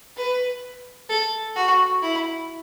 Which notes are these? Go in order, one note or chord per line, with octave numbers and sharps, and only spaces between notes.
B4
A4
F#4
E4